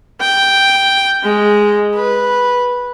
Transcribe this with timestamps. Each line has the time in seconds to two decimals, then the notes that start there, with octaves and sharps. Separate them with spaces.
0.21 G5
1.23 G#3
1.95 B4